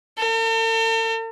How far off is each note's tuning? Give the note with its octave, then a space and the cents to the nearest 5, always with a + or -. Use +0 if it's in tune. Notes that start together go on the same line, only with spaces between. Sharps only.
A4 +45